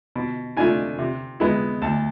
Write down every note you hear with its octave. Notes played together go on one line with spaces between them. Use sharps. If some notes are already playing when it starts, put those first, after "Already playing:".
B2
A3 D4 F4 G#5
C3
G#3 B3 E4
D2 A5